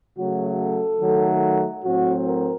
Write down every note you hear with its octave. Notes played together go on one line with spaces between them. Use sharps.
C#3 F#3 A3 F#4
A4
D#3 F#3 A3
A2 F#3 C4 F#4
A#4